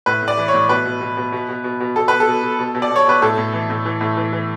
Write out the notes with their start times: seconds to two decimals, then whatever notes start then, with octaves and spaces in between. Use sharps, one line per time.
0.06 A2 B4
0.22 A2
0.28 D5
0.38 E3
0.48 C#5
0.54 A2
0.69 B2 B4
0.85 B2
1.01 B2
1.17 B2
1.32 B2
1.49 B2
1.64 B2
1.80 B2
1.96 B2 A4
2.08 B2 B4
2.20 A4
2.27 B2
2.43 B2
2.59 B2
2.75 B2
2.82 D5
2.91 B2 C#5
3.06 B2 B4
3.22 A2 A4
3.38 A2
3.53 E3
3.70 A2
3.85 E3
4.01 A2
4.17 E3
4.33 E3